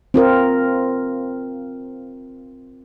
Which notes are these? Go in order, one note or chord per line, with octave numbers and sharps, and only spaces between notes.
C4 F4 A#4